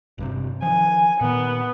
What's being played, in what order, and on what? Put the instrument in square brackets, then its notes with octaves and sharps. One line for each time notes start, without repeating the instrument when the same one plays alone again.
[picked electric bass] G#1 G2 C3
[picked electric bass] D#3 F3 [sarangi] G#5
[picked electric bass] A#2 D#3 [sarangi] B3